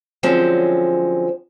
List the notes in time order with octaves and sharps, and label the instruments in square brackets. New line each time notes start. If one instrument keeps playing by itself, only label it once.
[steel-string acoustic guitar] D3 F3 F#3 G#3 C4 C#4